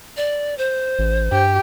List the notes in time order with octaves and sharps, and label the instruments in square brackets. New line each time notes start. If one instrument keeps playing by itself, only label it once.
[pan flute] D5
C5
[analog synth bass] A1
[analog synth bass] G2 [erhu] G4